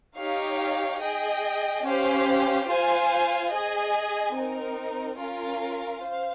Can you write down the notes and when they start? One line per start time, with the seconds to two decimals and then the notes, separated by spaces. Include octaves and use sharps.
0.17 D#4 G4 C#5 F5
1.00 G#4 D#5 G5
1.84 C#4 G4 C5 F5
2.68 F4 C5 F5 G#5
3.52 G#4 D#5 G#5
4.35 C4 D#4 A#4
5.19 C#4 F4 A#4 F5
6.03 C5 F5